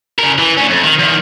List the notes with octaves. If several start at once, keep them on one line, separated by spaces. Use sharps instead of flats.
C#3 A#4
E3
D2 C#4
F2
D#3
E2 D#3